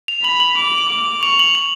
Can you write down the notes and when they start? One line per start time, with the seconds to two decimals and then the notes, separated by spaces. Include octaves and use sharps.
0.08 F7
0.24 B5 F#7
0.40 F#7
0.58 D6
0.89 D6
1.23 C#6 F7
1.39 F#7
1.55 F7